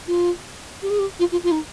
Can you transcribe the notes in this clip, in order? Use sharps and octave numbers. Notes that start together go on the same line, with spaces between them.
F4
G4
G#4
G4
F4
F4
F4
D#4